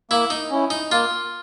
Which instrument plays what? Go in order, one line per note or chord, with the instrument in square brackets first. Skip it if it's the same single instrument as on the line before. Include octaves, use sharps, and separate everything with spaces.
[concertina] A#3 [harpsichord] E4
[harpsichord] D#4
[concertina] C#4 E4
[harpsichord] D#4
[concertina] A#3 [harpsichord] F4